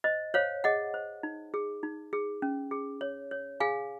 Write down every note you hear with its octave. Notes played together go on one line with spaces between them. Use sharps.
C5 D#5
C5 C#5 F5
G#4 D#5 F#5
C5
D#4
G#4
D#4
G#4
C#4
G#4
C#5
C#5
G#4 F5 G#5